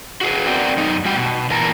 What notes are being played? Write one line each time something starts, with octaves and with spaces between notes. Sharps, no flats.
F#4 G#4 B4
B3 C4 A#4 D5 F#5 G5
F#2 D#4
G3 F#4 G5
B2
A#2 E3 A#4 A5 A#5